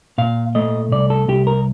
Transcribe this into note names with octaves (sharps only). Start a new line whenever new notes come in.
A#2 F5
A3 D#5
C2 D5
A4
C2 G4
A#4